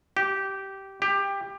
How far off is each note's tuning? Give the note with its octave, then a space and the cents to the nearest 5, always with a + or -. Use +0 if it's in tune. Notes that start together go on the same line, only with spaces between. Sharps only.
G4 -15
G4 +15